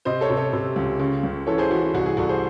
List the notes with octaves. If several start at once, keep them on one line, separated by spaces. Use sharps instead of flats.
C3 C5 D#5
A4 C#5
C3
A4 C#5
C3
C#2
C#3
C#2
E3 A4 C#5
G#4 C5
E3 F#4
F#4
C2 F#4
G#4
C2 F#4 A4
G#4 C5